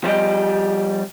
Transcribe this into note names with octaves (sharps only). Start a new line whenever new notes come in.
F3 G3 G4 D#5